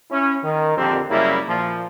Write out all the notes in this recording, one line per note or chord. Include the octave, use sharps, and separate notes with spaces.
C#4 E4
D#3
A#1 F2 D3 C4 G4 A#4
F#2 C#3 G3 A#3 E4
A#2 F3